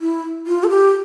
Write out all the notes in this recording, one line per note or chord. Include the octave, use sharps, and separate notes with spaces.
E4
F4
A4
G4